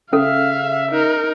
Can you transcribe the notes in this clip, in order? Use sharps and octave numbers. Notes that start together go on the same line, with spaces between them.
C#3 C#4 A4 E5 F5
D#4 A#4